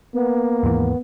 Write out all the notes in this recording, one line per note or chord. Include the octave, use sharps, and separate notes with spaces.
A#3 B3
D#2 G#2 E3